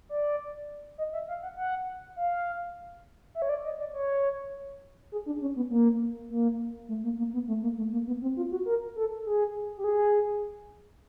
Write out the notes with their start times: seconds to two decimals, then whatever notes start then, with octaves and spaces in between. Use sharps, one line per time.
0.09 D5
0.98 D#5
1.13 E5
1.28 F5
1.42 F#5
1.57 F#5
2.16 F5
3.35 E5
3.42 C#5
3.49 D5
3.64 D#5
3.79 D5
3.93 C#5
5.12 G#4
5.26 D4
5.41 C#4
5.56 B3
5.70 A#3
6.30 A#3
6.88 A3
7.04 A#3
7.18 A#3
7.33 B3
7.48 A3
7.62 A#3
7.77 A3
7.92 A#3
8.07 B3
8.22 C4
8.37 F4
8.51 F#4
8.66 A#4
8.96 A4
9.26 G#4
9.77 G4
9.84 G#4